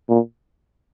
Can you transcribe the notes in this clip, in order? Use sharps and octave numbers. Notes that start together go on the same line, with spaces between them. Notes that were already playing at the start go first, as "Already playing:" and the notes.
A#2